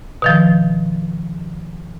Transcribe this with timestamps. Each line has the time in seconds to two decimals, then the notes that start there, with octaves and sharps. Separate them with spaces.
0.22 B2 D#3 F3